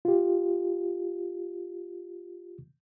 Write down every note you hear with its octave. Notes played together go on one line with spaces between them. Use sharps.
F4 G4